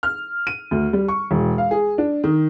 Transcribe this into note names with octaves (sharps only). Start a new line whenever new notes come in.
F6
D#7
D2
G3
C#6
E1
F5
G#4
D4
D#3